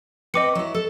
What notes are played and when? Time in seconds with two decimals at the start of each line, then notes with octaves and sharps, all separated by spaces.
0.34 C4 B4 D#5 G5 D6 C#7
0.55 F#3 E4
0.74 A4